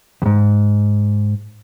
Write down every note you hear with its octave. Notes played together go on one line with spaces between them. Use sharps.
E2 G#2